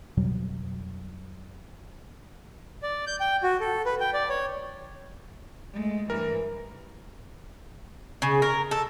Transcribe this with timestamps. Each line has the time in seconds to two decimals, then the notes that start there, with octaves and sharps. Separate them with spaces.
0.17 F2 B2 F#3 G3
2.83 D5
3.07 G6
3.20 G5
3.43 F#4
3.60 A4
3.86 B4
4.00 G5
4.13 D5
4.29 C#5
5.73 G#3 A3
6.10 G2 E3 A#4
8.22 C#3
8.42 A#4
8.71 A4